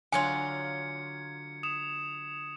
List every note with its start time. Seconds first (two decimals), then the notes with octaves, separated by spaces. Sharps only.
0.12 D3 F#3 F4 G#5 G#6 C#7
1.63 D#6 E7